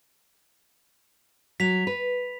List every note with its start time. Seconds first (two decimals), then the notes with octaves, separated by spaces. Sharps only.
1.60 F#3 B6 F7
1.87 B4